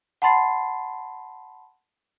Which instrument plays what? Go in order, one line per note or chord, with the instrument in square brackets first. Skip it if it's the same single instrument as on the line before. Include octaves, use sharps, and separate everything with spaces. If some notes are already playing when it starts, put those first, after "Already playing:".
[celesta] F#5 A5 B5 C6 A6 C7